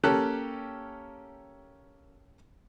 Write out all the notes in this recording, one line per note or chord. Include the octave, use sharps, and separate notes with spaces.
A#3 C#4 G4 A4 F#6